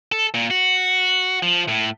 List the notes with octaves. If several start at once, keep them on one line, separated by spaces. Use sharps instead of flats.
A4
A#2
F#4
F3
A2